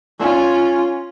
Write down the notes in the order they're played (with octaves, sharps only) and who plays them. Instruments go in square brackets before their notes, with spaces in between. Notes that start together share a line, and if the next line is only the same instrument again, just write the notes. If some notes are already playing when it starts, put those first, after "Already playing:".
[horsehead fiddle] C#4 F4